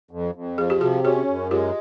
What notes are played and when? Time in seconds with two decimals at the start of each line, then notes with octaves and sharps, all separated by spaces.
0.11 F2
0.35 F2
0.58 F3 G#4
0.70 G4
0.81 C3 F#4 G#4
1.04 C#4 F#4 G#4
1.28 F#2
1.51 G#3 F4 G4